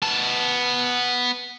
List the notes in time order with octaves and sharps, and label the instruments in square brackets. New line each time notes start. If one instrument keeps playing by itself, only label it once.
[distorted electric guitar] B3 A5